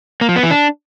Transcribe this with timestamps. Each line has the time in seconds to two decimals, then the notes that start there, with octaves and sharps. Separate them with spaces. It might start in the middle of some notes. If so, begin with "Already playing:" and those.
0.21 A#3
0.29 F3
0.36 B3
0.43 E3
0.51 D4